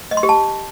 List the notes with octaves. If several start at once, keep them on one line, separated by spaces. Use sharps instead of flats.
D#5
C6
G4
A5